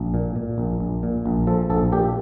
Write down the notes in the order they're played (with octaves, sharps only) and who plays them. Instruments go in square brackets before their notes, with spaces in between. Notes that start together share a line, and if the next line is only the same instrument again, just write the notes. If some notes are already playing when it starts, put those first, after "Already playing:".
Already playing: [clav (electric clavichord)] A#1
A#2
A#2
A#1
A#1
A#2
A#1
F3 A4
A#1 A4
A#2 G4